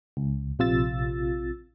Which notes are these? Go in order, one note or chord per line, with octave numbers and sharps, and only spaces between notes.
C#2
A#1 C3 F4 E6 A6